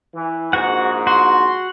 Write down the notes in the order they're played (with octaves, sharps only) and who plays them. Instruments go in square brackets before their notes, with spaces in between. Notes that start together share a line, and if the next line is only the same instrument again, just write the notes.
[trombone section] E3
[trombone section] A#1 G#2 [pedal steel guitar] F#4 F#5
[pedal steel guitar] F#4 [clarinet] C6